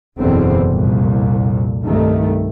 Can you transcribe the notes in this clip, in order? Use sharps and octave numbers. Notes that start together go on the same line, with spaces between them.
F#1 E2 B2 D3 E3 C4
C2 F2 A#2
C2 G2 D#3 A3